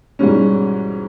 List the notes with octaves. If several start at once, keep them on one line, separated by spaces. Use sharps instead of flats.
G#2 B2 E3 G3 G#3 C#4